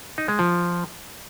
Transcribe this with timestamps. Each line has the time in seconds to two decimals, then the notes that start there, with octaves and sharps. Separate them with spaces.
0.18 D#4
0.28 G#3
0.39 F3